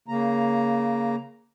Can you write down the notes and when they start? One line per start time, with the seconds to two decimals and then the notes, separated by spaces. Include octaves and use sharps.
0.08 C#3 A#3 A#5